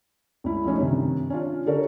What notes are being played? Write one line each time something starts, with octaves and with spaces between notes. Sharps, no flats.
C#2 E4
F3 A3 C#4 D#4
G2 C3 D#3
C#4 D4 F4
D3 G4 A4 A#4 C#5